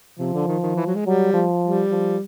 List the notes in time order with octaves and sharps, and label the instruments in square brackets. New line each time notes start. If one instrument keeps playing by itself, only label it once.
[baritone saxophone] C3 [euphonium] F3
[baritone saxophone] D3
D#3
D#3
E3
F#3
G#3
[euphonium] F#3 [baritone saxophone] G3
[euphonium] F3
[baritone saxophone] G3
[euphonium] F3